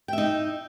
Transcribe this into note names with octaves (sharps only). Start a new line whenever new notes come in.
D#4 E5 G5